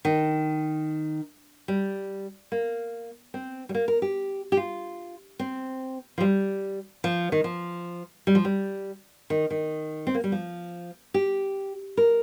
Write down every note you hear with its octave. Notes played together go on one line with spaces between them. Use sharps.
D#3
G3
A#3
C4
G3
A#3
A#4
G4
G4
F4
C4
F3
G3
F3
D#3
F3
G3
F3
G3
D#3
D#3
C4
A#3
G3
F3
G4
A#4